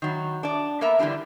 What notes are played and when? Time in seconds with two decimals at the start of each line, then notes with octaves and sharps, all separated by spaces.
0.02 D#3 F#3
0.43 D4 D5
0.81 A#3 B3 A#4 E5 A#5
0.99 D3 E3 G3 D4